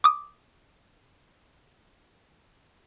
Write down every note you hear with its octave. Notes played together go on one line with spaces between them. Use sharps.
D6 D#6